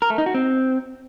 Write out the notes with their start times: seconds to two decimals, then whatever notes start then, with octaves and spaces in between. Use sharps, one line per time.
0.02 A#4
0.10 A3
0.18 D#4
0.26 F#4
0.34 C4